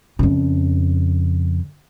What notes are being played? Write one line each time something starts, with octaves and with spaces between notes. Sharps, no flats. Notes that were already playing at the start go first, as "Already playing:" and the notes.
F2 C#3